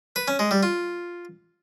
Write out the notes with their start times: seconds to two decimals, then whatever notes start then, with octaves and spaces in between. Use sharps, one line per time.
0.16 B4
0.28 C#4
0.39 G#3
0.51 G3
0.63 F4